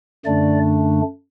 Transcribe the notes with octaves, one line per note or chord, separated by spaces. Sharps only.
F#2 D3 A3 D4 D5